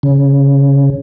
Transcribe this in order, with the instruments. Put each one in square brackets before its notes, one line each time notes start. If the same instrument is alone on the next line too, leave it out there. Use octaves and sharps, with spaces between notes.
[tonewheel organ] C#3